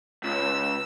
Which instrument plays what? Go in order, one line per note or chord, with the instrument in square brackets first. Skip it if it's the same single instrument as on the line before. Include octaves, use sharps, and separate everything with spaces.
[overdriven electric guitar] C#2 [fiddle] E6